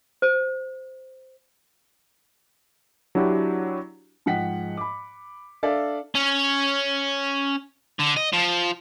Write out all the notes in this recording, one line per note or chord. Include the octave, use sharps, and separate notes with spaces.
C5
F#3 D4 E4 F#4 G4
G#2 F3 F#5 G5 B6
B5 D6
D4 A4 D5 E5 F5
C#4
D3
D#5
F3